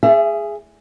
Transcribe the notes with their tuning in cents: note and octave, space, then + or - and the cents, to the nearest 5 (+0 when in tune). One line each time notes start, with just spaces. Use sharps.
G#4 +0 E5 +30